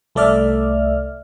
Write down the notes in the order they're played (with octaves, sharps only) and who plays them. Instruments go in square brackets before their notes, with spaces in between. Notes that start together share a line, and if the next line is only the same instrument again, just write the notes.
[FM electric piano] C2 A3 A4 D5 E5 F6